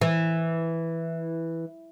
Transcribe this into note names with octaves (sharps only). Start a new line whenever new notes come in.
E3